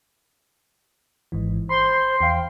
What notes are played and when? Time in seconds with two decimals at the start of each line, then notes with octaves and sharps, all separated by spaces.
1.32 G#1 G#2 E3
1.69 C5 B5 C6
2.21 E2 F5 G5